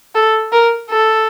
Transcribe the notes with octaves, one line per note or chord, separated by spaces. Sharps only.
A4
A#4
A4